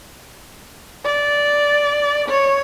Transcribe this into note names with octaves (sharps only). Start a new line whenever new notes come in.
D5
C#5